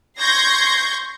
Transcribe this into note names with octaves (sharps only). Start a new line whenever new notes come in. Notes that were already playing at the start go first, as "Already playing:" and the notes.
C6 C#6 G6 G#6 A#6 C7